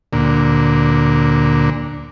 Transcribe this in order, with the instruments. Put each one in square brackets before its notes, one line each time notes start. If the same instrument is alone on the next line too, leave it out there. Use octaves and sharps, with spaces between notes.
[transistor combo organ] D2 A#2